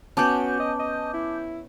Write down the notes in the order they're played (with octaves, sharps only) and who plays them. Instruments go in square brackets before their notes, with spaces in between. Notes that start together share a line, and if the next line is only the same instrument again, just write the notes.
[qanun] B3 C#4 [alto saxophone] F#4 [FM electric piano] A5 D6 G6
[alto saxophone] D#5
D#5
E4